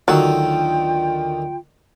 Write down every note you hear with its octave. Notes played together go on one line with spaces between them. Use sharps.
D2 D#3 F#3 F4 A4 G5